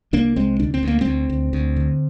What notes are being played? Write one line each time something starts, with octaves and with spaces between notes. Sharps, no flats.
C2 A#3 D4
C2 G#3 C4
D2 D4
C4
D2 A#3
G#3 C4
D2
D2
D2
D3